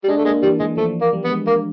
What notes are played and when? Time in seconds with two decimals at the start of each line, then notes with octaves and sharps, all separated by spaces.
0.03 G3
0.08 G#3 D4
0.17 A3
0.25 G#3 A#3
0.42 E3 G3
0.60 E3 G#3
0.77 F3 A3
1.01 A#3
1.13 G3
1.25 B3
1.30 G#3
1.47 A#3